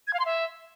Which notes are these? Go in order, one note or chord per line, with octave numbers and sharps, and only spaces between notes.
G#6
F5
C6
E5